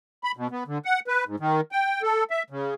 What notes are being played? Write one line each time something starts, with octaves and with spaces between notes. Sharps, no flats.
B5
B2
B3
D3
F#5
B4
G#2
D#3
G5
A4
E5
C#3